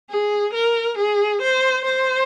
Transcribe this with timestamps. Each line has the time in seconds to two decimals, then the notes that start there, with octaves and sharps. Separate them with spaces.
0.10 G#4
0.53 A#4
0.98 G#4
1.42 C5
1.85 C5